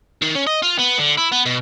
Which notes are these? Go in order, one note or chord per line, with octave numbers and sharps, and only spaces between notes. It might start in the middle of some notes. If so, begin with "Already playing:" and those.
D#3
C#4
D#5
F4
B3
D3
E4
B3
B2